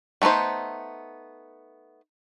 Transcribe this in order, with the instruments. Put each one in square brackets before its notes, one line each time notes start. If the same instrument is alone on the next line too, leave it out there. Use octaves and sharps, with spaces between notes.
[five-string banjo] G3 A3 B3 D#4 C5